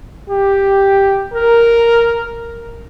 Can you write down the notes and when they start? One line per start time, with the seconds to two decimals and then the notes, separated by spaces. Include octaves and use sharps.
0.29 G4
1.34 A#4